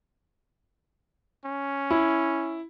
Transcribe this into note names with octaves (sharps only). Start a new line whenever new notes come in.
C#4
E4